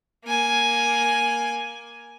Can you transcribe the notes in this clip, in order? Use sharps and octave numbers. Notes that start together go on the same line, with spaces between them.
A#3 G#5